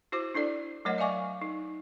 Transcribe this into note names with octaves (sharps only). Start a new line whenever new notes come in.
E4 F#4 C5 D6
D4 E4 A4 D5
F#3 A3 A#4 C#5 D#5 F#5
D5 E5 F5 G#5 C#6 D6
D#4